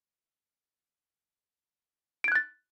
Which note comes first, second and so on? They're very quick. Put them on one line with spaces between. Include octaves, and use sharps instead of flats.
D7 G#6 F#6 A6